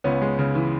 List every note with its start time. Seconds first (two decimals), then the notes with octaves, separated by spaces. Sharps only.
0.04 C#2 B3 C#4
0.22 G#3
0.39 C#3
0.55 E3